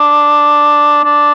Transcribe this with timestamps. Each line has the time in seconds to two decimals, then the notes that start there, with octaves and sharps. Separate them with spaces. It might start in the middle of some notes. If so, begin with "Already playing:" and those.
Already playing: D4
1.04 D4